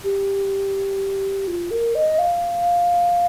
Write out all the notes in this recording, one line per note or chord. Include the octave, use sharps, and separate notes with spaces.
G4
F4
A#4
D#5
F5